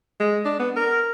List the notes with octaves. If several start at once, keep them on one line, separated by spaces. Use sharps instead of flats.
G#3
D4
B3
A#4